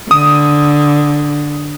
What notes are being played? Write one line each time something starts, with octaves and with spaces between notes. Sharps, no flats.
D3 D#6